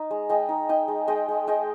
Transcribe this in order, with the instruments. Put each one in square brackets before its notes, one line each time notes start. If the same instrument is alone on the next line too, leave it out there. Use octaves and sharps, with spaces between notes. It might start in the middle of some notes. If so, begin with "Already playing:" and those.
Already playing: [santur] D#4 D#5
G#3
G#3 D#5 G5
D#4
D#4 D#5 G5
G#3
G#3 D#5 G5
G#3
G#3 D#5 G5